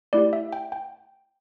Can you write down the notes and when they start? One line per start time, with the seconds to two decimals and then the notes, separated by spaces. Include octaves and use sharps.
0.13 A3 E4 G4 D5
0.33 E5
0.53 G5
0.72 G5